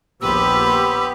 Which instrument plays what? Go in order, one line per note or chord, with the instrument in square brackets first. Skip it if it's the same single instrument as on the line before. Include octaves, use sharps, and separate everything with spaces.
[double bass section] A#1 D#2 [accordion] B3 G4 [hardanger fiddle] B4 [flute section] B5 C6 E6